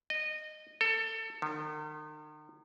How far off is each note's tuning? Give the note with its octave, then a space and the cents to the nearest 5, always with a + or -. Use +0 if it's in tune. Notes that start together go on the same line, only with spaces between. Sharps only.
D#5 -20
A4 +25
D#3 -40